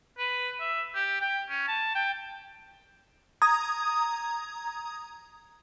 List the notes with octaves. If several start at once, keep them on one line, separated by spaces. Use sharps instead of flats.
B4
E5
G4
G5
C#4
A5
G5
A#5 D#6 G#6